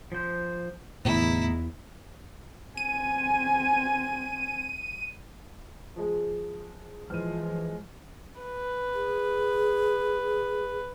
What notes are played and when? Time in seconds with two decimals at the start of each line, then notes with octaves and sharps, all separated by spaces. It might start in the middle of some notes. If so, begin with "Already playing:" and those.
0.12 F3 C5
1.05 E2 A2 D3 B3 D#4 E4
2.77 C4 G#5 D#7
5.96 F3 G#3
7.10 E3 F3 G#3 F6 D#7
8.41 B4
8.94 G#4